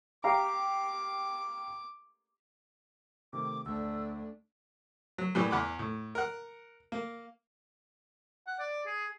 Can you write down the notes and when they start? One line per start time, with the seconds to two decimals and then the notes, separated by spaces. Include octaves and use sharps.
0.24 G4 F5 A#5 D6
3.33 C3 D#3 A3 D6
3.66 D2 A3 D4 E6
5.18 F#3
5.35 A2 E3 F#3 G3
5.51 E2 F#5 B5 D6
5.79 A2
6.15 A#4 F#5
6.92 A#3
8.47 F#5
8.59 D5
8.86 G#4